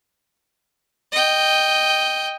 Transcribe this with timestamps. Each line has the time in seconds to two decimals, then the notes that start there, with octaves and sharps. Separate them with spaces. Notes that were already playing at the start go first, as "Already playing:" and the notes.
1.12 D#5 G5